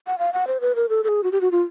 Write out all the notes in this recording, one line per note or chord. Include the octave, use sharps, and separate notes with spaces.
F#5
F5
F#5
C5
B4
A#4
A4
A4
G#4
F#4
G4
F#4
F4